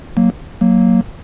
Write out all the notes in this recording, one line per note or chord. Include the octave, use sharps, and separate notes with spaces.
F#3 A#3
F#3 A#3